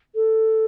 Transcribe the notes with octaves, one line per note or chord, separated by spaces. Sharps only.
A4